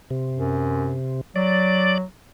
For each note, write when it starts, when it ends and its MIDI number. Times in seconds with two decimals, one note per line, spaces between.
0.10 1.21 48
0.36 0.96 42
1.36 2.03 54
1.36 1.98 74